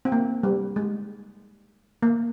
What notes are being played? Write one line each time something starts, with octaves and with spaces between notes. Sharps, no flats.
C4
A#3
G3
G#3
A#3